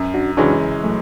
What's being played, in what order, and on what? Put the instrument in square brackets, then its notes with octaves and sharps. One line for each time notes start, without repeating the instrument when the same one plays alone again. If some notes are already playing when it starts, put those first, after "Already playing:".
Already playing: [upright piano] F#2
[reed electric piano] D4 F#4
[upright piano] C#3 E3 G#3 C#4 [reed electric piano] D4 F#4
[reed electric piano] F#3 A3